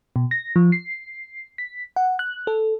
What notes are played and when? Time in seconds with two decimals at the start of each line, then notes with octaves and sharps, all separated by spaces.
0.16 B2
0.31 A#6
0.56 F3
0.72 C7
1.58 B6
1.96 F#5
2.19 F#6
2.47 A4